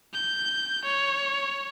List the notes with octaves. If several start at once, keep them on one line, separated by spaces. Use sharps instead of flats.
G6
C#5